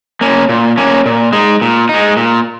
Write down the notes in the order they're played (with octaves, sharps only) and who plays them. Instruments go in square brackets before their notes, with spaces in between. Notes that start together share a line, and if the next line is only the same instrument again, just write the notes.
[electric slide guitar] A#3 C#4
A#2
A#3 C#4
A#2
G#3 D#4
A#2
G#3 D#4
A#2